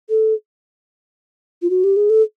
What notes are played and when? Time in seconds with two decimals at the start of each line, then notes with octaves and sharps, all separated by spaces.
0.10 A4
1.62 F4
1.70 F#4
1.84 G4
1.96 G#4
2.10 A4